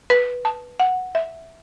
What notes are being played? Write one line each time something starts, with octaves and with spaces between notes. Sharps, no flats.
B4
A5
F#5
E5